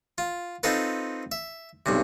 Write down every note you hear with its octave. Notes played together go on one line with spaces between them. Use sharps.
F4
C4 D#4 F4 A4 B4
E5
B1 G2 C3